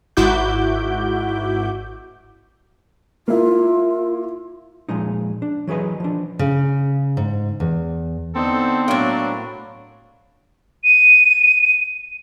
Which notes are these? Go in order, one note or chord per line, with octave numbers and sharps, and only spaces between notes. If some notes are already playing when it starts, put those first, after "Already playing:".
G#1 G#2 E4 F#4 D6 G6
A#3 E4 F4
A#2 F3 G#3 D#4
D4
E3 F#3 G#4 B4 D#5
F3 D4
C#3
G#2
E2
D3 B3 C4 D#4 A4
A2 F#3 A#3 D4
D#7